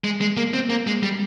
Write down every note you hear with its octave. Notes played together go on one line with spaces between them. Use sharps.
G#3
G#3
A#3
C4
A#3
G#3
G3